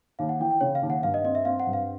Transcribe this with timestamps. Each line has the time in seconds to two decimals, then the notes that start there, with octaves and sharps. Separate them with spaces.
0.19 D#2 F5
0.29 F#5
0.40 E3 G5
0.51 G5
0.61 C#3 C#5
0.75 F5
0.82 D#2
0.90 F#5
1.03 G2 F5
1.14 D#5
1.24 C4 D#5
1.35 E5
1.45 C4 F5
1.60 F#5
1.67 G2
1.73 F5